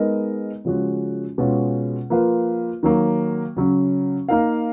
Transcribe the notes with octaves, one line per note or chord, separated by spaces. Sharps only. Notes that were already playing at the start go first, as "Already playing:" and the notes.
Already playing: G#3 B3 D#4 A#4 D#5
C#3 F3 G#3 C#4 F#4
B2 G#3 C#4 F4
F3 A#3 F4 B4 F5
D#3 F#3 A#3
C#3 F#3 C#4
A#3 D#4 A#4 F5